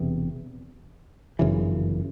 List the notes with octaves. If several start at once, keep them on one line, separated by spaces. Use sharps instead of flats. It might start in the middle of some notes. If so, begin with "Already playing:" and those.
Already playing: E1 E2 C3
G1 F#2 C#3 E3